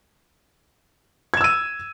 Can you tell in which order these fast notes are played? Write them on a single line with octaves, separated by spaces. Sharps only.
G#6 E7 E6 D#7